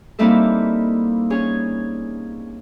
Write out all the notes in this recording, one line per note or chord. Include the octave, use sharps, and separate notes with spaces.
G3 A#3 C4 D#4 E4 A4
C#4 G#4 C#5